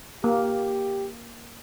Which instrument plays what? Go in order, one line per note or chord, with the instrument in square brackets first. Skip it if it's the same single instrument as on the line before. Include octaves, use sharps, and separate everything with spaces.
[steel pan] A#3 [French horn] G4